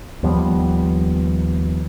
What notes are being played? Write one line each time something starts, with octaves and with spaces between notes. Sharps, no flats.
D#2 F3 G3 B3